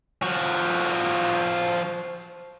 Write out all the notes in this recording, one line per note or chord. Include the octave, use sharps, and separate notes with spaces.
F3 F#4